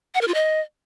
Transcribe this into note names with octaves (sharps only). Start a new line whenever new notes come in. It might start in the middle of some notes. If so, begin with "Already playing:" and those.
F#5
A#4
F4
D#5